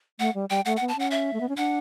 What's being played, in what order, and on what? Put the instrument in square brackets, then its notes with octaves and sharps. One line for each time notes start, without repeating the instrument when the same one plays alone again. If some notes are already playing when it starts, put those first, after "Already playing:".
[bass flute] A3 [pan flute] F#5
[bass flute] G3
[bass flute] G3 [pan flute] G5
[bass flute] A3 [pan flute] F#5
[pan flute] F#5
[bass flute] B3
[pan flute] A5
[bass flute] C#4 [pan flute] F#5
[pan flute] E5
[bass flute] A3
B3
C#4
[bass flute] D4 [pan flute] F#5